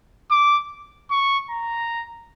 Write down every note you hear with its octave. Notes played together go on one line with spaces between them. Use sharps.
D6
C#6
A#5